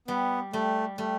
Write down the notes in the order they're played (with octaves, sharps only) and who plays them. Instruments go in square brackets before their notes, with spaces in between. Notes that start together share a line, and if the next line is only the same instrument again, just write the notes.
[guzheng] G3 [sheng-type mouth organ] B3
[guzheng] G3 [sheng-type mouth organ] A3
[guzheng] G3 [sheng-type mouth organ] A3